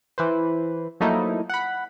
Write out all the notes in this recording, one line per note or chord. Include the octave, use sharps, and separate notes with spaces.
E3 B4 C5
F3 F#3 A3 A#3 D#4 E4
F#5 B5